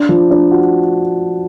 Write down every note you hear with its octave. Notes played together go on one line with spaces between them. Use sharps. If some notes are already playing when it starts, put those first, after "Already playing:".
Already playing: D4
F3
D4
F#4